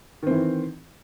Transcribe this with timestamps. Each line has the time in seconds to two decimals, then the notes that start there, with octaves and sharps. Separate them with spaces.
0.23 D#3
0.27 C4
0.31 E3